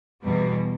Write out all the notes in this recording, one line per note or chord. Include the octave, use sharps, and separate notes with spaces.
E2 B2 G3